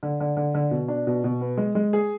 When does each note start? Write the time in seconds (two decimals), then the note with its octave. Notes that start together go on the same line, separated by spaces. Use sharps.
0.03 D3
0.20 D3
0.37 D3
0.55 D3
0.71 B2
0.88 D4
1.07 B2
1.24 B2
1.41 B3
1.57 G#3
1.75 G#3
1.93 G#4